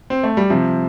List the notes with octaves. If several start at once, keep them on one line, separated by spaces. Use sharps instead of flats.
C4
A3
G3
C3 F3